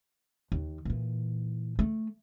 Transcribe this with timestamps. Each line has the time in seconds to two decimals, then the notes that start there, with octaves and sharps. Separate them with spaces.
0.52 D#2
0.85 A#2 E3
1.79 A3